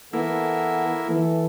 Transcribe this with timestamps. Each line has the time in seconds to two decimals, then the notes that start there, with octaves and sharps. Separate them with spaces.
0.13 E3 A#3 B3 E4 A4
1.09 E3 A4